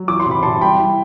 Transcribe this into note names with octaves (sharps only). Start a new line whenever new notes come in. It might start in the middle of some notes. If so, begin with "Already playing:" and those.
Already playing: F#3
E3 D6
C6
C3
B5
C3 A5 C6
G3 G5 B5
E4